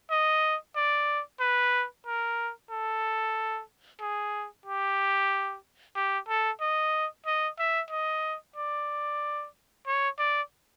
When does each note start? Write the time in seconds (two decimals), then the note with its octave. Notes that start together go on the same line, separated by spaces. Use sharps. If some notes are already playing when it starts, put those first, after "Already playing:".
0.10 D#5
0.76 D5
1.40 B4
2.06 A#4
2.71 A4
4.01 G#4
4.66 G4
5.96 G4
6.28 A4
6.61 D#5
7.26 D#5
7.59 E5
7.91 D#5
8.56 D5
9.86 C#5
10.19 D5